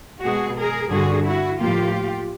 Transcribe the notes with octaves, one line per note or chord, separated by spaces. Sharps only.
B2 G#3 F#4 G#4
G#4 A#4
G2 D3 G3 F#4 G#4
E4 F#4
A2 F3 A#3 F4 G4